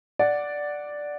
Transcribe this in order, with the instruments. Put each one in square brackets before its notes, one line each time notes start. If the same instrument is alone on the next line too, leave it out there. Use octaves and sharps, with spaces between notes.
[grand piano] D5 F#5